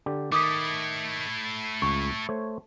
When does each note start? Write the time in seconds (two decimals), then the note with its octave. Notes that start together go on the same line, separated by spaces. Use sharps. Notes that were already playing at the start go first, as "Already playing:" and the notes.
0.06 D3 G4
0.32 D#3 A3 E4 D6 D#6 B6
1.82 C#2 C#6
2.29 A3 C5 C#5